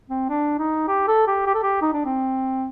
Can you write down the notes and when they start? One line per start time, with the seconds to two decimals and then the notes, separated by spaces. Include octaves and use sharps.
0.10 C4
0.29 D4
0.59 D#4
0.88 G4
1.07 A4
1.27 G4
1.46 G4
1.54 A4
1.63 G4
1.82 D#4
1.93 D4
2.05 C4